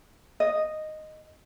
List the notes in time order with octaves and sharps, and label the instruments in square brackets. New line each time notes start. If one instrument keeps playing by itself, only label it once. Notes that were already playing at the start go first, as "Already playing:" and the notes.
[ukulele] D#5